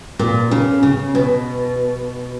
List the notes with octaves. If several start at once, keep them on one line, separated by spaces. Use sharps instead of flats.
A#2
C#3
C#3
B2